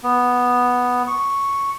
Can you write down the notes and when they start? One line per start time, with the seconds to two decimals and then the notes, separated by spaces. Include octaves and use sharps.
0.04 B3
1.08 C#6